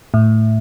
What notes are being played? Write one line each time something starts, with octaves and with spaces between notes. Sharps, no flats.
A2